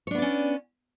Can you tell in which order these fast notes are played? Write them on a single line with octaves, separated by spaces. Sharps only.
C#5 D4 B3 D5 C#4